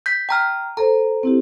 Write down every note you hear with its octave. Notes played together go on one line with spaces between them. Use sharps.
G6 B6
G5 A#5 F6
A4 C5 A#5
C4 E4 G4